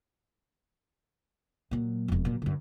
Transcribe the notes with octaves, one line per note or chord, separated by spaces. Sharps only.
A#2 F#3
E1 F2
A#2 F#3
F#2 D3